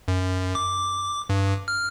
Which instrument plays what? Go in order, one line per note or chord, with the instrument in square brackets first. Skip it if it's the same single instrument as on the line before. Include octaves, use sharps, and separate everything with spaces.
[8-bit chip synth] F#2
D6
G2
F6